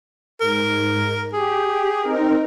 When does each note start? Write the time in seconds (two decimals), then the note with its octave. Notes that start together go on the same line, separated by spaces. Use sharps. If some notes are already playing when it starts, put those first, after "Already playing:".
0.41 G#2 A#4
1.33 G4 G#4
2.01 C4 D#4 A#4